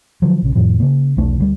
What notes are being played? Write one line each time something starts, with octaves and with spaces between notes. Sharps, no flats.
D3 F3 F#3
A#1 C#3
F2 A2 D#3 F3
C#3 A#3
B1 E2 A3 D4
D2 F#3 G3